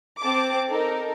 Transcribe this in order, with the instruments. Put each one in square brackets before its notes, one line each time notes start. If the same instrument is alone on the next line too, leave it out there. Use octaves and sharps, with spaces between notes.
[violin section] C4 A5 D6
D#4 A4 A#4